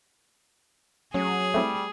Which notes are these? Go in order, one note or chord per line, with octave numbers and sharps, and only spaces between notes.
F#3 A3 C#4 G#4 C#7
G3 A3 C4 E4